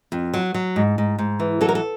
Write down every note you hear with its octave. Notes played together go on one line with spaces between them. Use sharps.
F2
F#3
F#3
G#2
G#2
G#2
E3
F#3 A4
A#4
A4